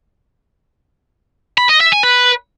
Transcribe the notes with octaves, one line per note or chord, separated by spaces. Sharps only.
B5
D#5
E5
G#5
B4